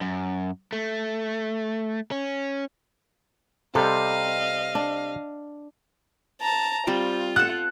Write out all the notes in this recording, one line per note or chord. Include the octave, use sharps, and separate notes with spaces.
F#2
A3
C#4
C3 G3 A4 C5 D#5 F5
D4
A5 A#5
G3 C4 F4 G5
A4 F#5 F#6